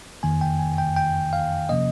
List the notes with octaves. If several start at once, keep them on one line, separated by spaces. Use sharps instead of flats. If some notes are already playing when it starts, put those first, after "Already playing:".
F2 D#3 A#3 G#5
G5
G#5
G5
G5
F5
C3 F3 A#3 C#4 D#5